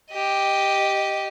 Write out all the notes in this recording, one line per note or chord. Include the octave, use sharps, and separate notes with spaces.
G4 D#5